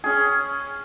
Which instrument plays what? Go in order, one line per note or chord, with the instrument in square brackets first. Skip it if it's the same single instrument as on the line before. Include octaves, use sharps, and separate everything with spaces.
[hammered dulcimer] C#4 G#4